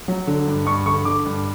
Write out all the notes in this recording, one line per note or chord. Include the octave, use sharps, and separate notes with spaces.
F#3
D3
G2
G2 C#6
D3 C#6
D3 D6
G2